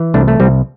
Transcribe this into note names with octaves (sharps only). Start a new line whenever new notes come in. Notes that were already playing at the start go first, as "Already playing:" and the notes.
Already playing: E3
C2 A3 D4
A3
C2 G3 C4